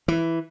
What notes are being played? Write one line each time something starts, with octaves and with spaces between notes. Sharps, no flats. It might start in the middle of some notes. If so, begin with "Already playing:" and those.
E3